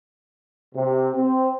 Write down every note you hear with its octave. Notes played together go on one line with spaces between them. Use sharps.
C3
C4